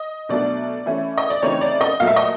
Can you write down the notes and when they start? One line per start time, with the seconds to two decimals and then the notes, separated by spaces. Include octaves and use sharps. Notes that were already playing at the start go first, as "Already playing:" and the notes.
Already playing: D#5
0.29 B2 F#3 A3 D4 D5
0.86 E3 A3 C#4 E4
1.18 D#5
1.30 D5
1.43 C#3 E3 A3 C4 D#4 C#5
1.61 D5
1.81 D#5
2.00 A#2 F#3 A3 F5
2.07 E5
2.16 D#5